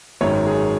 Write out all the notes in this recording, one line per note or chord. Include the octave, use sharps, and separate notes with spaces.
G#1 F#2 D#3 G#3 C#5
G#4